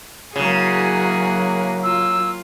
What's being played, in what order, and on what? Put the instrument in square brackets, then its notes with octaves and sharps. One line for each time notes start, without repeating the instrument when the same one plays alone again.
[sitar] C#3 [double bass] F#3 A#3 [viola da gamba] E4 F#4 G#4
[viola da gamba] F4 [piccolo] E6